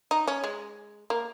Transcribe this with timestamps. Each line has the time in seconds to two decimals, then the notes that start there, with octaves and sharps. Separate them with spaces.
0.11 D#4
0.27 C#4
0.44 G#3
1.10 A#3